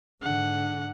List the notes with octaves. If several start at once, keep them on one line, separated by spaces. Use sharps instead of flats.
G#2 D3 F#5